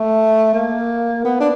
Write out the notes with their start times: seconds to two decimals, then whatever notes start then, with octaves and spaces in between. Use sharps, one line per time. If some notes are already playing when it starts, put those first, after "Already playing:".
Already playing: A3
0.54 A#3
1.24 B3
1.40 D4